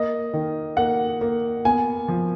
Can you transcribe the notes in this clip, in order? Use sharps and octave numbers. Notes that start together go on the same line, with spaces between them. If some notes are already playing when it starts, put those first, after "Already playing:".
Already playing: A#3 D#5
D#3
A#3 F#5
A#3
B3 G#5
F3